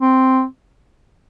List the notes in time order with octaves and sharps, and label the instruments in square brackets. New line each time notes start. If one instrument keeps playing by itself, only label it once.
[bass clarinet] C4